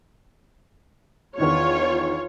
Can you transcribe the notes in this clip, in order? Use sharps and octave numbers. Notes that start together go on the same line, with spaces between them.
E2 D#3 D4 F4 C#5